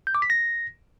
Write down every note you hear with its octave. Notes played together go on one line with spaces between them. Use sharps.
G6
D6
B6
A#6